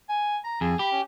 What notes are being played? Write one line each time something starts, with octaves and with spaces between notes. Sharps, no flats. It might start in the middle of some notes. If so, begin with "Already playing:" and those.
G#5
A#5
F2 G#4
G4 B5
C#4